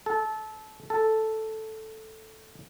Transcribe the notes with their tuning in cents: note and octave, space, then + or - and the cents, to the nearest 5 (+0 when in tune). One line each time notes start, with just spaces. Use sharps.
A4 -20
A4 +0